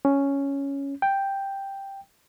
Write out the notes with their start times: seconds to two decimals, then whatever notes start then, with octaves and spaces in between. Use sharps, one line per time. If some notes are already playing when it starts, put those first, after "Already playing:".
0.05 C#4
1.02 G5